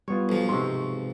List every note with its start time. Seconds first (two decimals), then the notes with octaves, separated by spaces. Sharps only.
0.08 G3 B3 F4 C#5
0.29 B1 F3
0.49 G#2 C3 C6 C#6